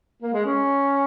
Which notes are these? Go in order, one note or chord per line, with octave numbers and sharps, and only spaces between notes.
A#3
G#3
C#4